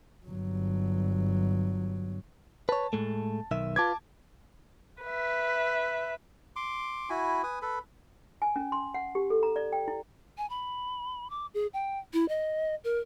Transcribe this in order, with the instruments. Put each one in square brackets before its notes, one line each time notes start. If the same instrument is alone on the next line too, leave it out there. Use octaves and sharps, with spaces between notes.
[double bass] G1 F#3
[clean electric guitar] B4 C#5 [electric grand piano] A5
[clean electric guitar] A2 G#3 A3
B1 D#3 E5
[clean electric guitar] F4 B4 [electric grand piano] A5 D6 G#6
[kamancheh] B4 E5
[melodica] C6 D6
E4 F#4 G#5 B5
B4 G#5 D#6
A4 B4 B5
[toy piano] G#5
C#4
C6
F#5
G4
A4
A#5
D5
G5
E4
[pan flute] G#5
B5
D6
G#4
G5
E4
D#5
A#4